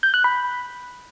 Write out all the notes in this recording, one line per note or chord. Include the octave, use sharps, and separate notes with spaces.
G6
F#6
B5